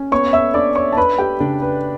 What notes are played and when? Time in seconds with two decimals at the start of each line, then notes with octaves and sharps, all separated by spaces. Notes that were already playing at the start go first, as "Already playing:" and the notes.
Already playing: C#4
0.12 B3 C#5 C#6
0.33 E5 E6
0.54 D4 D5 D6
0.75 C#5 C#6
0.93 A5
0.97 D4 B4 B5
1.18 G4 G5
1.40 C#3 D4 D5
1.62 B4